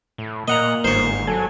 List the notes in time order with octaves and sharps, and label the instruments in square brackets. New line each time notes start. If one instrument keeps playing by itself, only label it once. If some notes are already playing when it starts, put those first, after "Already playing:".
[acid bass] A2
[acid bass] A#2 [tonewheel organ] A#3 [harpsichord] D#5 F#5 A#5
[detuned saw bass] G1 [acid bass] G#2 [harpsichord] C5 C#5
[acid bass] F#3 [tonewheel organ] A4 G#5